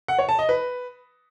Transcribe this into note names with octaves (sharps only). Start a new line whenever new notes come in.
F#5
C#5
A5
D#5
B4